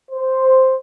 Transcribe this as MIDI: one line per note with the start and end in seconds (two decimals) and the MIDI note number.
0.11 0.74 72